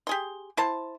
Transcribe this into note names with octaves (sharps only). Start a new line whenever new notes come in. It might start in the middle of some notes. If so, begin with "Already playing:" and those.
G4 G#4 C6
E4 C5 A5